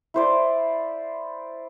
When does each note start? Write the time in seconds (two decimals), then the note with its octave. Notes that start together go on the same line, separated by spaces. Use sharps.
0.14 E4 C5 D5